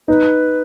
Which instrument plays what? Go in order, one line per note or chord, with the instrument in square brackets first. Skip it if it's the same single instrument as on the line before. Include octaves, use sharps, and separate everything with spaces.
[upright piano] D#4 [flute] B4